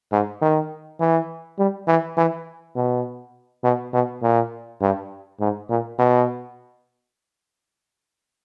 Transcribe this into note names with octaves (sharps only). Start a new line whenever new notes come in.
G#2
D#3
E3
G3
E3
E3
B2
B2
B2
A#2
G2
G#2
A#2
B2